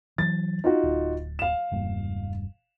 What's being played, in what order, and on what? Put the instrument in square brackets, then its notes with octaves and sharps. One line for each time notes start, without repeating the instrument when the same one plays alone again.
[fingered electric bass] E3 F#3 [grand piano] A6
[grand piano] D#4 F4 F#4
[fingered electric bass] D1
[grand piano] F5 E7
[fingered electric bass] E1 G2 A#3